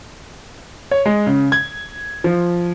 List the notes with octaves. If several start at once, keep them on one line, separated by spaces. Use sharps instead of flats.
C#5
G#3
C#3
G#6
F3